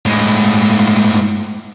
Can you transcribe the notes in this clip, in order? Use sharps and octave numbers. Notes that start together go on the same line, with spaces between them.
A2 G#3